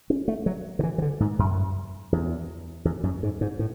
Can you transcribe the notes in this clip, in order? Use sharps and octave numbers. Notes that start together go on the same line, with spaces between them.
C#4
A3
F#3
D3
E3
E3
D3
G#2
F#2
E2
E2
F#2
G#2
G#2
A2